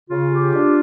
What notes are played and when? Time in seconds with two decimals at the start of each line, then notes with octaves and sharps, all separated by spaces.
0.10 C#3 F4
0.31 G4
0.52 D4